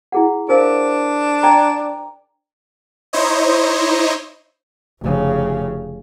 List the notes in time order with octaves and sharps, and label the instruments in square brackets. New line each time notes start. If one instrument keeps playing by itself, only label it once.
[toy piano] E4 G#4 F#5
[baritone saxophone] D4 [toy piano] A#4 C5 F5
[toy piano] D5 G5 A#5
[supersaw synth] D#4 E4 C5 C#5 D#5
[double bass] F1 C#3